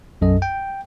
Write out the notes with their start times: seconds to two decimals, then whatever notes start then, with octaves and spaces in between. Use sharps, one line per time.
0.21 B1 F#2 A4 D#5
0.42 G5